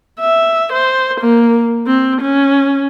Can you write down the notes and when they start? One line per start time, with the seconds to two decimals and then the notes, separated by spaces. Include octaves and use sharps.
0.20 E5
0.73 C5
1.21 A#3
1.87 C4
2.21 C#4